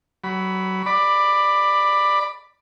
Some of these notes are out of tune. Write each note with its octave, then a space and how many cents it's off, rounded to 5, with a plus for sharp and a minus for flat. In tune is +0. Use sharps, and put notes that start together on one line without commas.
F#3 +25 B5 +0
D5 +15 B5 +0 D6 +0